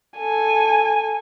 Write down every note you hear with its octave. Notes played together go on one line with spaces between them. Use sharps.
A4 G#5